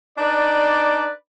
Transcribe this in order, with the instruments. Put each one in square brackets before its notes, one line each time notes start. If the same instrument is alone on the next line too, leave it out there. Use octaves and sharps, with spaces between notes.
[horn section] D4 D#4 B4 D5